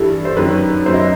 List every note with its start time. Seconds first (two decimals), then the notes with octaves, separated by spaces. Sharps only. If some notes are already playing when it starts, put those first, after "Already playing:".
Already playing: G2 E3 G3 A4
0.25 C5
0.36 F#2 D#3 F#3 B4
0.86 F#2 F#3 B3 C5
0.94 D#5